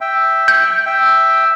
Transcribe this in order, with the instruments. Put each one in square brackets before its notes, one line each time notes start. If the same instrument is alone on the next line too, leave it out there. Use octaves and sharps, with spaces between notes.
[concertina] E5 G5
[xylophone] G6
[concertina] E5 G5